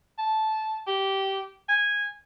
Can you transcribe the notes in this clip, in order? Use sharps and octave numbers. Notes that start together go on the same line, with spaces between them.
A5
G4
G#5